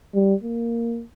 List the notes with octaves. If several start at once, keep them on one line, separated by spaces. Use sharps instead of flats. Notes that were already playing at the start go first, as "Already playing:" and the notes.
G3
A#3